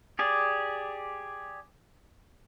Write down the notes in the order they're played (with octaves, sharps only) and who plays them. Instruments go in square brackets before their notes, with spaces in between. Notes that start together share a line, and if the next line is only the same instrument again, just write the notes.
[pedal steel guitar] G4 G#4 D5